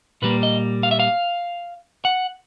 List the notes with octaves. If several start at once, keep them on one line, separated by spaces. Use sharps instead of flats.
A#2 G3 A#3 B4
D#5
F5
E5
F5
F#5